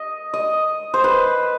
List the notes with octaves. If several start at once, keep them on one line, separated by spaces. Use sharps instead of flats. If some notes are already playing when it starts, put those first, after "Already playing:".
Already playing: D#5
D#5
C5
B4